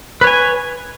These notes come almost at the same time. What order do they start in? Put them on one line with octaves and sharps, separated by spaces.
B4 C#5 G#5